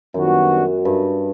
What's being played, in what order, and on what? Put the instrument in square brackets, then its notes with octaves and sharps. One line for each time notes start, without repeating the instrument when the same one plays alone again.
[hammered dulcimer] F#2 [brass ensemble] D#3 G3 B3 D4 F#4
[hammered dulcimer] G2